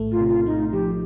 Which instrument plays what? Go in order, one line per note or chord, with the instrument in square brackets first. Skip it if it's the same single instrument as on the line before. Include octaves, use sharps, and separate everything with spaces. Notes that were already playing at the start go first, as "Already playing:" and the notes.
Already playing: [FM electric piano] A#1 A2 A3
[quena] F4
[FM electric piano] C3
[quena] F4
[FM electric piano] A3 [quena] D#4
[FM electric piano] F3 [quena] G4